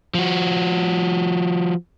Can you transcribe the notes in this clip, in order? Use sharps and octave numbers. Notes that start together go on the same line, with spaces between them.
F3 F#4